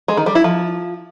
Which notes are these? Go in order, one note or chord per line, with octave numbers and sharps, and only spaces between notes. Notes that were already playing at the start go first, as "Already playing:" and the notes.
G#3
D#3
G3
E4
F3